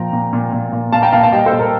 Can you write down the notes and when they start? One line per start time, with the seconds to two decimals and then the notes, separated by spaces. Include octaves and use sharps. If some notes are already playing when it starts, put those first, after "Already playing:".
Already playing: A#2 F3 G5 A#5
0.13 A#2
0.33 A#2
0.53 A#2
0.73 A#2
0.92 A#2 F5 A5
1.02 G5 A#5
1.12 A#2 F5 A5
1.23 F5 A5
1.32 G3 D#5 G5
1.46 A4 C5
1.53 A#2
1.59 A#4